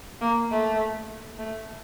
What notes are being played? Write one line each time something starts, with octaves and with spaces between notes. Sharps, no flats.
A#3
A3
A3